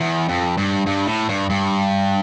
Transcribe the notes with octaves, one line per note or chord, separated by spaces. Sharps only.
E2
F2
G2
G2
A2
G2
G2